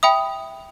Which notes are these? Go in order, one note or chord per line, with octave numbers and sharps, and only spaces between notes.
E5 G5 B5 D#6